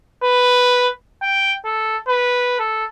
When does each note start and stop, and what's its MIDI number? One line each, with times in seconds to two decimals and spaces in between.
0.24 0.90 71
1.22 1.55 79
1.65 1.97 69
2.08 2.55 71
2.59 2.86 69